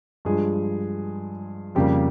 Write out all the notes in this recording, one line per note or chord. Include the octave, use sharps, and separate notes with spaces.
G2 F3 G#3 G#4
F2 C#3 G3 A#3 G4